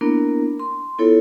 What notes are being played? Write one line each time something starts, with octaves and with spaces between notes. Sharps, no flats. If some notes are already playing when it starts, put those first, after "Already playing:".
A#3 B3 D4 E4 A#4
C6
B3 E4 F4 A4 C#5